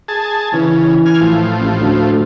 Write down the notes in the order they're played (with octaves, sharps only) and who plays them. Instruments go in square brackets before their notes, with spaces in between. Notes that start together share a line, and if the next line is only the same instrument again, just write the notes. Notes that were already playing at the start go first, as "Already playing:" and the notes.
[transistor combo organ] G#4 A5
[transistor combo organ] C#3 [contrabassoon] E3
[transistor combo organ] G#5 F6
A2 F3
[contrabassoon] A1
D2